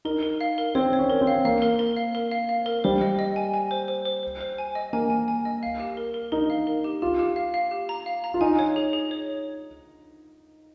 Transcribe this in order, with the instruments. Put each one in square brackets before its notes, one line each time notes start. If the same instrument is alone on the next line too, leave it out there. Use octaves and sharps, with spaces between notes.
[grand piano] D#4 [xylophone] A#4
[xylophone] A#4
F5
A#4
[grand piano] C4 [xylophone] C#5
[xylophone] C#5
[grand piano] C#4
[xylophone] A#4
[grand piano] C4
[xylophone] F5
[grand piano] A#3 [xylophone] F5
[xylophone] A#4
A#4
F5
A#4
F5
F5
A#4
[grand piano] G3 [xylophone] C5
[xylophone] D#5
D#5
G#5
G#5
C5
C5
C5
C5
C5
G#5
D#5
[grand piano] A#3 [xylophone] G#5
[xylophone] G#5
G#5
D#5
F5
G4
A#4
A#4
[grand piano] D#4 [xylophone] A#4
[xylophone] F5
A#4
G4
[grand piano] F4 [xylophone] G4
[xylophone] G4
F5
F5
G4
A#5
F5
A#5
[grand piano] F4
[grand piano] D#4 [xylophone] G#5
[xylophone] C#5
G#4
G#4
C#5